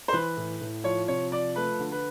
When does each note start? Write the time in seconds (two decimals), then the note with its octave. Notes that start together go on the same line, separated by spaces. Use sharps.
0.08 C5
0.13 E3 B4
0.37 A2
0.61 A2
0.84 F3 C#5
1.08 C3 C#5
1.32 F3 D5
1.56 A3 B4
1.79 D3
1.92 B4